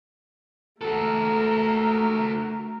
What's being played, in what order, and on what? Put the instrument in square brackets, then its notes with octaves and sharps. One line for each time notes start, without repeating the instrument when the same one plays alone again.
[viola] A3 A#4 [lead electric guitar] F#4 A4